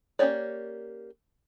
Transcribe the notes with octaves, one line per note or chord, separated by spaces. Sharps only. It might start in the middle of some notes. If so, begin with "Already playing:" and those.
A#3 C#4 G4 C#5 D5